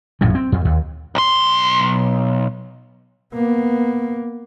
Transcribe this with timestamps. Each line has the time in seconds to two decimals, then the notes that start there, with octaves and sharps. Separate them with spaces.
0.21 A#1 F#2 A2 E3
0.35 C4
0.52 F2
0.65 D#2
1.15 B1 C6
3.34 A#3 B3